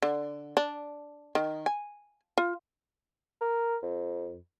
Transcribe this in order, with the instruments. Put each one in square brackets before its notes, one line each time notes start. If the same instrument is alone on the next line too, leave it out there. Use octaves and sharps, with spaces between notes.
[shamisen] D3
D4
D#3
G#5
F4
[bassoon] A#4
F2